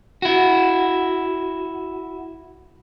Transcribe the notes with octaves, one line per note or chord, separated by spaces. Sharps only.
E4 F#4